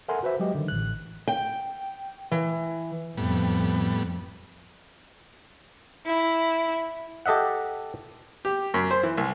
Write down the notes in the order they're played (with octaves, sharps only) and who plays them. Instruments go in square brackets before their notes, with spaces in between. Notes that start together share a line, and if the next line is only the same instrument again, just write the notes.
[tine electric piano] A4 A#4 E5 F#5 G#5 C6
F#4 B4 C5 E5
F#3 G#3 G4 D#5
D3 D#3
A1 F#6
[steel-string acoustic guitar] G5
E3
[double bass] F2 [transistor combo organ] A2 G3 B3
[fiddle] E4
[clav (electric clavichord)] G4 A4 D#5 E5 F#5
[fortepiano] G4
F#2
C5
E3
C2